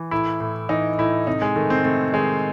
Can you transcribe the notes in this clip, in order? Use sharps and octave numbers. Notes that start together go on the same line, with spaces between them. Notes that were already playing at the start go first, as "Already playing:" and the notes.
Already playing: E3
A2 E4
A2
E3 D#4
A2 E4
C3 D#4
G#3
D#3 A3
C4
C3 A3
D#3 G#3